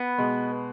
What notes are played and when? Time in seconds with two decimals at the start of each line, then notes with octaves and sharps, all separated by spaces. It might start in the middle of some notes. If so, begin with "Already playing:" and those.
Already playing: B3
0.18 B2 G#3